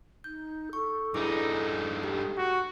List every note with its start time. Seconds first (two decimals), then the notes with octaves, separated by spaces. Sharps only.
0.24 D#4 G6
0.73 A4 C#6
1.14 G2 D#4 E4 G#4 D6
2.03 G4
2.38 F#4